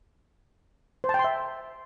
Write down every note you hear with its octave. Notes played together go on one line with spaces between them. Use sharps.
C5
A5
G5
C6
E5